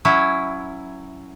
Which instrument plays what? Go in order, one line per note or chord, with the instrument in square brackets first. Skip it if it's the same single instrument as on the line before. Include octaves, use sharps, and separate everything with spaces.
[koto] F#3 C#4 E4